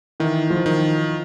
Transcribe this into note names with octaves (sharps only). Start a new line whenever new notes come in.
D#3 E3
F3
D#3